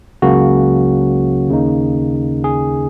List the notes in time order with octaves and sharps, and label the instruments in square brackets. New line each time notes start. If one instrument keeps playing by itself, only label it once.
[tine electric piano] C#2 C#3 F#3 A#3 C#4 F#4
D#2 C#3 A#3 D#4
G#4